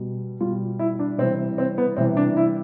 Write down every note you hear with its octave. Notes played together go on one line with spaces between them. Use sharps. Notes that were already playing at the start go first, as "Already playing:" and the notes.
Already playing: B2 G3
B2 G3 F4
E4
D4
C3 E3 G3 C4
C4
B3
C3 E3 G3 C4
D4
E4